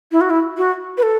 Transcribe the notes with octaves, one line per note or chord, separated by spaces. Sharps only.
E4
F#4
E4
F#4
B4
A4